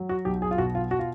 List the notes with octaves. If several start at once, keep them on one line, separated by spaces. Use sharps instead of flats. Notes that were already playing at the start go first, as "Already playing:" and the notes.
Already playing: F#3
F#4
B1 G4
G#4
F4
B2 F#4
F4
F#4
F4